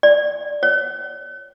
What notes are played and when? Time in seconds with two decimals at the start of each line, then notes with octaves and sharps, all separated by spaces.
0.03 D5
0.63 C#5